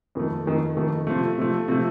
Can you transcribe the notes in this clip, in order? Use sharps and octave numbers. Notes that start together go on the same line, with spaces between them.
F2 D#3 A3
F2 D#3 A3
F2 D#3 A3
C3 F3 A3
C3 F3 A3
C3 F3 A3